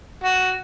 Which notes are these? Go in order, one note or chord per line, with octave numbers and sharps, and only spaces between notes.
F#4